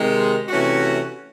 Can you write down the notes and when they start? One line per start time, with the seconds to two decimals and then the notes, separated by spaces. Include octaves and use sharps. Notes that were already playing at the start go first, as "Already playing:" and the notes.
Already playing: C3 D#3 G#3
0.48 C3 E3 A3 C#4 F#4